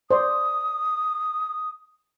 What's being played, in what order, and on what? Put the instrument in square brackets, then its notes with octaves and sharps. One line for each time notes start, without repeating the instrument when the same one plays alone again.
[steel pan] C5 D5 C6 [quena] D#6